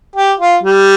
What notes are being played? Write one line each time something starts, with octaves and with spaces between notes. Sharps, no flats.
G4
F4
G3